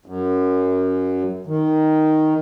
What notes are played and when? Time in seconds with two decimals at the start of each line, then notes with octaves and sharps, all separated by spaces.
0.06 F#2
1.47 D#3